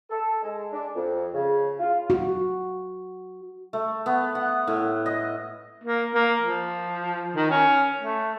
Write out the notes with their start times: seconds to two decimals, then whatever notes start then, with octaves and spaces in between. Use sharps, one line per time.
0.10 A4
0.42 G#3
0.72 D4
0.95 F2
1.34 C#3
1.80 F4
2.10 F#4
3.73 A3
4.06 B3
4.35 F#5
4.67 A2
5.06 D#5
5.84 A#3
6.15 A#3
6.42 F3
7.36 D#3
7.51 C#4
8.01 A3